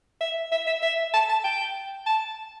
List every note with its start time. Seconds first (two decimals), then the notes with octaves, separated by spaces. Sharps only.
0.21 E5
0.52 E5
0.67 E5
0.82 E5
1.14 A5
1.29 A5
1.44 G5
2.07 A5